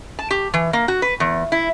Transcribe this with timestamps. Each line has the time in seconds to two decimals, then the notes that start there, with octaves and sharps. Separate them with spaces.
0.19 A5
0.31 G4
0.54 E3
0.73 A#3
0.88 F#4
1.02 B4
1.20 E2
1.52 E4